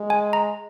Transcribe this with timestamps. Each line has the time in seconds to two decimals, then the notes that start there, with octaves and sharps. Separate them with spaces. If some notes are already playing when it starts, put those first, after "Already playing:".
Already playing: G#3
0.10 G#5
0.33 A#5